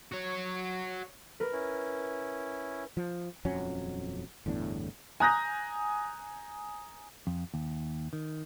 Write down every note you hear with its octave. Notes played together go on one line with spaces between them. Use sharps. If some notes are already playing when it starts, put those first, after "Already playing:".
F#4 C#5
A#4 B4
C#4 E4
F3
D#1 F2 F#3 C#4
G1 E2 A2 D4
G#5 A#5 D#6 F#6 G6 A#6
F2
D#2
D#3